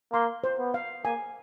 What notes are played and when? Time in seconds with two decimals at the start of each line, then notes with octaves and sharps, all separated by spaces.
0.13 A#3 C6
0.44 C5
0.59 B3
0.74 F5
1.04 A#3 G#5